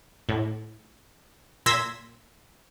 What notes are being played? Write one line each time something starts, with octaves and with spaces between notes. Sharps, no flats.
A2
A#2 C6 E6 G#6 A#6 B6